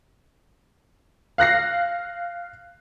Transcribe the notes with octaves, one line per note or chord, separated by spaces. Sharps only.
F5 F#6 A#6 C7